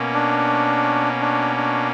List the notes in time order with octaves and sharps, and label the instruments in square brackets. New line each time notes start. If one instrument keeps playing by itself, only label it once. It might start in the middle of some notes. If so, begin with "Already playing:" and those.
Already playing: [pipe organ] B2 A#3 C#4
[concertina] D4
D4
D4